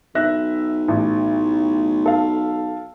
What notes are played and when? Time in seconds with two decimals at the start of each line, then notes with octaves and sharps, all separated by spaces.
0.15 B1 E5 F#6 A#6
0.88 A1
2.06 A4 F5